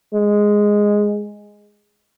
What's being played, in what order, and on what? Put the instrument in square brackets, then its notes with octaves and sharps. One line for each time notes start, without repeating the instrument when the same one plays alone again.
[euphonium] G#3